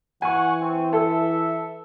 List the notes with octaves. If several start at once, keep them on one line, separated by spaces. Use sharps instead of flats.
E3 F#5 G#5 C#6
C4
A4 E5